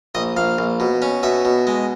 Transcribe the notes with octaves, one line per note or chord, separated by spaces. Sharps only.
A#1 D#5
A#1 F5
A#1
B2
C#4
B2 E5
B2
G#3